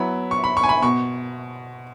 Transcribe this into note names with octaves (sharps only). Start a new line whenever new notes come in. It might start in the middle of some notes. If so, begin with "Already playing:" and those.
Already playing: F#3 B3 E4 B5
C#6
B5
C#6
G#5
B5
B2 C#6